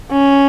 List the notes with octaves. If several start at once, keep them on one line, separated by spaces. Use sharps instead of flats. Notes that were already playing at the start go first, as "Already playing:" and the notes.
C#4